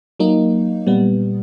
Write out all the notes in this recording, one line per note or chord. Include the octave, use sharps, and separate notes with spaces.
F#3 A#3 D#4
A#2 G3 B3